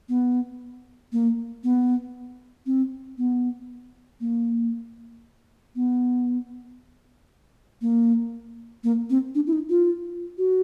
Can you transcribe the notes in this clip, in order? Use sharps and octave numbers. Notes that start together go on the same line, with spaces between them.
B3
A#3
B3
C4
B3
A#3
B3
A#3
A#3
C4
D4
E4
D#4
F4
F#4